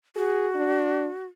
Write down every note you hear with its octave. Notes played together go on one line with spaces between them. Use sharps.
F#4 G#4
D4